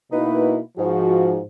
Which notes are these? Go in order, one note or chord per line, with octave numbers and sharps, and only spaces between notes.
B2 A#3 D#4 E4 B4
G#2 F3 F#4